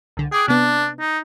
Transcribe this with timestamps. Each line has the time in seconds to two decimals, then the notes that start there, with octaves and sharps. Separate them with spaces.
0.17 C2 D3
0.32 G#4 G5 D6 F#6
0.48 C3 B3 D4
0.99 D#4